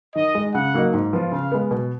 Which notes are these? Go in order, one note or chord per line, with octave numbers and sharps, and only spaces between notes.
D#3 D#5
G#3 D#4
C#3 F#5
F#3 A#3 D#4
G#2
F3 B3 F4
C#3 F5
G#3 B3
B2